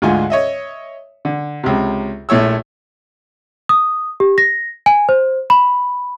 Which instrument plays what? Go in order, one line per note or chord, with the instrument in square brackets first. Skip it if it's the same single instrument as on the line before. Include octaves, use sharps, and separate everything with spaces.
[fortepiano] D2 G#2 D3 F4 G#5
C#5 D#5 E5
D3
C#2 C3
A#1 A3 E4 C#5 E6
[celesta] D#6
G4
A#6
G#5
C5
B5